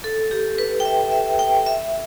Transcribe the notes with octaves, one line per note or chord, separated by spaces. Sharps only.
A4
G4
B4
G5
E5
E5
G5
E5